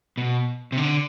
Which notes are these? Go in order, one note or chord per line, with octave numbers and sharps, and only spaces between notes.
B2
C3
D3